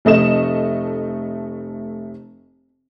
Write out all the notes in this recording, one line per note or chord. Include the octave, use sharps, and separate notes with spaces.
F1 A3 D#5 E7